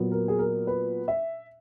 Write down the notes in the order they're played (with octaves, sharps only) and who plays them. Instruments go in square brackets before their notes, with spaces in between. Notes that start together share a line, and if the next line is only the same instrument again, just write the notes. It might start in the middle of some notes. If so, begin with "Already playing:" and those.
Already playing: [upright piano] A#2 F#3 B3
A#4
G#4
A#4
B4
E5